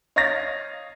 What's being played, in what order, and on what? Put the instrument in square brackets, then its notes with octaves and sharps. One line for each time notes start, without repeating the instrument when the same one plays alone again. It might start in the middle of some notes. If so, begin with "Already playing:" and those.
[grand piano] C#5 D#5 F5 C#6 A6 A#6